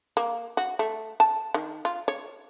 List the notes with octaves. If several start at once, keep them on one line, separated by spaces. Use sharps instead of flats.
A#3
F#4
A3
A5
D#3
F4
C#5